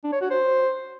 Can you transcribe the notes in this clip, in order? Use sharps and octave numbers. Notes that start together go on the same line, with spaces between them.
D4
C#5
F#4
C5